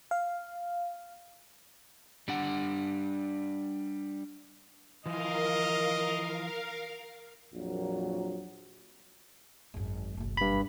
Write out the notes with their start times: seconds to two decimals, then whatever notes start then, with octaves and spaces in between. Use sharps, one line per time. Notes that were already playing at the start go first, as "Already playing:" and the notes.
0.11 F5
2.28 G3 D4 F#5
5.06 E3 F3 A#4 D#5 F5
7.54 A#1 F2 A#2 F#3
9.74 G#1 F#2
10.17 F#1 B1
10.37 G2 B5